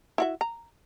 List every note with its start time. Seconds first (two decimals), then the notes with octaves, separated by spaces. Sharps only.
0.18 E4 F#4 E5
0.41 A#5